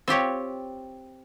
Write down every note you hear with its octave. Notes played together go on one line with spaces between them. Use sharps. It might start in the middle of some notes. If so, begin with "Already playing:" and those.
C4 F4 G4 C#5